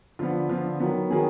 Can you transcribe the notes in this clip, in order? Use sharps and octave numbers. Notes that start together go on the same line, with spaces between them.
D3 F3 B3 F4
D3 F3 B3 F4
D#3 F#3 B3
D#3 F#3 B3 G#4